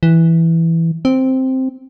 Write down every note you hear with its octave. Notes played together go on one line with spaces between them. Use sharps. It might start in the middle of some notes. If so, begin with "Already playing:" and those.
E3
C4